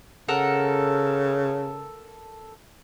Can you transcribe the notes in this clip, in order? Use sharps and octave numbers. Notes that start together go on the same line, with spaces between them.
C#3 A4 A#4 F#5